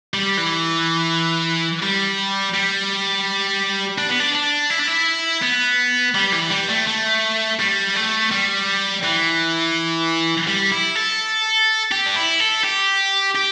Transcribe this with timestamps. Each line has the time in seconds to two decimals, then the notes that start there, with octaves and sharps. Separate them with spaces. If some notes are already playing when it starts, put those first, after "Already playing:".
0.14 G3
0.37 E3
1.82 G3
2.54 G3
3.98 D4
4.09 B3
4.19 D4
4.35 D4
4.70 E4
4.79 D4
4.87 E4
5.42 B3
6.15 G3
6.32 E3
6.50 G3
6.69 A3
6.87 A3
7.59 G3
7.95 A3
8.31 G3
9.03 E3
10.48 G3
10.72 E4
10.95 A4
11.92 G4
12.06 D4
12.16 E4
12.40 A4
12.64 G4
13.36 G4